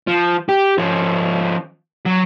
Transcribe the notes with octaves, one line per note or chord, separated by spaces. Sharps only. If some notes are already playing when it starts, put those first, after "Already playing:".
F3
G4
F3 C#4
F#3